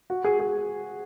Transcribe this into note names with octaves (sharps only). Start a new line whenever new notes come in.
F#4
G#4
G#4